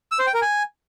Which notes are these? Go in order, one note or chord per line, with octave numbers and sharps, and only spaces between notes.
E6
C5
G5
A#4
G#5